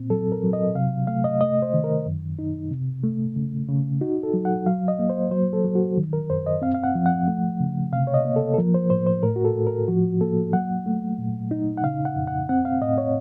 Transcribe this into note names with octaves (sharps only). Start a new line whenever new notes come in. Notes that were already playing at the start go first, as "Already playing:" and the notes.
Already playing: A#2 C4
F#3 A4
A#4
F#3
D#5
C3 F5
A3 F5
D#5
A3 D#5
C5
D#3
A#4
F#2
D#4
C3
A3
C#3
C#3
D#4 F#4
A4
F#3
F#5
F#3 F5
D#5
A#3
C5
F#3 C5
A4
F#3
F#4
D#3
A#4
F#2 C5
D#5
C4 F5
F5
F#5
F3
F#5
A3
C#3
C3 F5
C#5
D#5
A#3
A4
A4
F3 A#4
C5
A2 C5
C5
A2 A#4
F#4
A4
A2
A#4
F3 F#4
A#3 A4
F#3 F#5
A3
A#2
D#4
F#5
C#3 F5
F#5
F2
F#5
C4 F#5
F5
A2 D#5
C#5